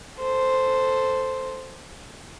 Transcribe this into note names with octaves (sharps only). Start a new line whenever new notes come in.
A4 C5